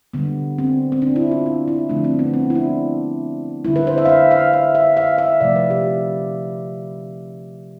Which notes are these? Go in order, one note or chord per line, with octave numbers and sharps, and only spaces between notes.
D3 G3 B3
C4
C4
D4
E4
F4
D4
E4
D3 F3 A3 D4
C4
B3
C4
E4
D4
D3 G3 E4
B4
C5
E5
F5
E5
F5
E5
E5
F5
E5
C3 F3 A3 D5
B4
G4